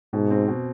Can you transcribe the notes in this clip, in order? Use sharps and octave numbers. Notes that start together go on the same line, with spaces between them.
G#2 B2
C4
B2